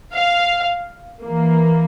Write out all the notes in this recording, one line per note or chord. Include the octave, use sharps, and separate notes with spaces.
F5
E3 A#3